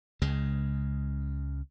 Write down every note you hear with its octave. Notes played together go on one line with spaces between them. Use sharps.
C#2 C#3 G#3